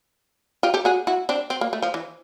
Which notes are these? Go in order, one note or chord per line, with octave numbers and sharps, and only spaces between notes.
F4 G4
G4 A4
F#4 G#4
E4 F#4
C4 D4
C4
A#3
A3
F3
E3